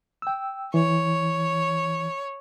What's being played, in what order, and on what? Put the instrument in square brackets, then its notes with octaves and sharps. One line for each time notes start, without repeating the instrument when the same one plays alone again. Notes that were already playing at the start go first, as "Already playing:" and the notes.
[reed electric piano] G5 E6
[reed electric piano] E3 [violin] C#5